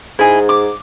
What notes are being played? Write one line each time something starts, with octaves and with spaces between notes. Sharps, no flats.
G#2 E4 G#4 D#5
D6